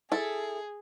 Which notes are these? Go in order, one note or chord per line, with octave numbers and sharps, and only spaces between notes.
E4 G#4 A4